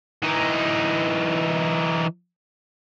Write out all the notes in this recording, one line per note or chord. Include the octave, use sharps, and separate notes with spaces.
E3 D#4